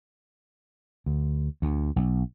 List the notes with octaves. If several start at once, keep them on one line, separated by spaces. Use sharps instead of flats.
D2
D2
B1